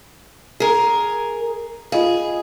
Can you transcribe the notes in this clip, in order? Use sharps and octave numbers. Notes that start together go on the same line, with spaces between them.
G#4 A#4
F4 G#4 D#5 F5